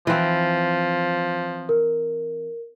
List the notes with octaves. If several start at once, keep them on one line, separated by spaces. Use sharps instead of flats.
E3 F3 C4
A#4